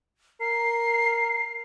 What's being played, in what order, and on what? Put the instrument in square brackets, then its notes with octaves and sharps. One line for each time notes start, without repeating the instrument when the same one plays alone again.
[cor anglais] A#4 [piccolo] C7